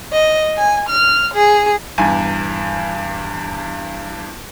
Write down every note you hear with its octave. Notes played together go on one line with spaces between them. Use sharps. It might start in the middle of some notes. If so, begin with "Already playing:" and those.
D#5
G#5
F6
G#4
D#1 E2 G2 G#5